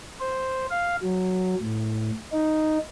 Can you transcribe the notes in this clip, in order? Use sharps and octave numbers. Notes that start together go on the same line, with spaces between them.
C5
F5
F#3
A2
D#4